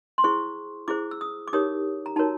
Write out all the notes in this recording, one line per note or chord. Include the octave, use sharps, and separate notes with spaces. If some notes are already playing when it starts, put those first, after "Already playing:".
C6
E4 G#4 C5 C#6
E4 G#4 C5 D6
E6
D#6
D6
D#4 G4 A#4 C#5 D#6
A#5
D#4 F#4 A#4 C#5 A5